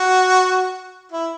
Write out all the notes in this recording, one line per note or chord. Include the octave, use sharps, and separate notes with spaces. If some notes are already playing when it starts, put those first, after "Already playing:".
Already playing: F#4
E4